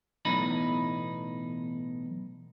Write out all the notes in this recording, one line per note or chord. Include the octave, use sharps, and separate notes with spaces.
B1 E2 A2 D#4 B5